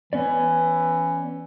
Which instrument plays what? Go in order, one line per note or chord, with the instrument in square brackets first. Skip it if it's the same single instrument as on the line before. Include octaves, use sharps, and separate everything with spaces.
[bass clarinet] E3 [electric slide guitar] B3 C#4 D5